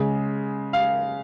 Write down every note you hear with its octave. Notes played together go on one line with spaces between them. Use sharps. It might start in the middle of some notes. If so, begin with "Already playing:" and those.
Already playing: C#3 G#3
F5